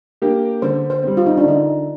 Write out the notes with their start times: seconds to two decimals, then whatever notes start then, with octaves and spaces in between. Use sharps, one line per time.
0.22 A#3 D4 G4
0.62 D3 C5
0.90 C5
1.03 G3 C4
1.17 F4
1.26 D#4
1.38 D4
1.44 D3 D#4